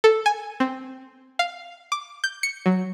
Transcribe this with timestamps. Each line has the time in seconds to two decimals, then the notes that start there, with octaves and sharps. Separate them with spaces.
0.04 A4
0.26 G#5
0.60 C4
1.39 F5
1.92 D6
2.24 G6
2.43 C#7
2.66 F#3